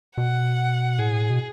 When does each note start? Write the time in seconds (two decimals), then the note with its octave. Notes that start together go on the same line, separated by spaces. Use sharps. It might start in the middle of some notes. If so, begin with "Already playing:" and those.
0.17 B2 F#5
0.99 A2 G#4
1.30 B2